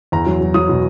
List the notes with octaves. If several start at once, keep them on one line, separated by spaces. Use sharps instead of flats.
E2 A#5
F#3
F#3
F#3 D#6
B2